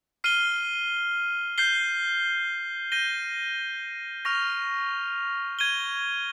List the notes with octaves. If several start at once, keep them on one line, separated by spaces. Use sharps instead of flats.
F6 C7 D#7 G7
G6 C7 G7
G6 A#6 D#7 G7
C#6 F6 A#6 F7
G#6 D#7 G7